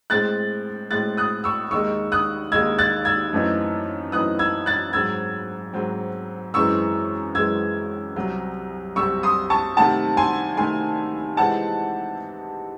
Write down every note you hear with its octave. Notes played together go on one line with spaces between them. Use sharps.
A2 G#3 C4 F#6 A6
A2 G#3 C4 F#6 A6
D#6 F#6
C#6 E6
D#2 D#3 G#3 D#4 C#6 E6
D#6 F#6
D#2 D#3 G#3 D#4 E6 G#6
F#6 A6
E6 G#6
F#2 E3 A3 C4 D#4
F#2 E3 A3 C4 D#4 D#6 F#6
E6 G#6
F#6 A6
G#2 F#3 C4 E6 G#6
G#2 F#3 C4
F#2 E3 G#3 C4 C#6 E6
F#2 E3 G#3 C4 E6 G#6
C2 C3 F#3 C4
C2 C3 F#3 C4 C#6 E6
C6 D#6
A5 C#6
C3 D#3 A3 C4 F#5 A5
G#5 C6
C3 D#3 A3 C4 G#5 C6
C3 E3 G#3 C4 D#4 F#5 A5